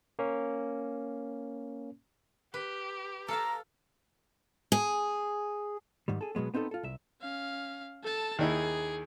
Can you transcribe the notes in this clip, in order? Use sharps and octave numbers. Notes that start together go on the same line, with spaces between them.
A#3 C#4
G4 B4
A4 F5 A5 A#5
G#4
G#2 D#3 G3
G#4 A4
B2 F#3 G#3 B3
B3 C4 D#4 F4 A4
F4 A4
C2 E5
C#4 F5
A4 A5
D#2 D#4 E4 G#4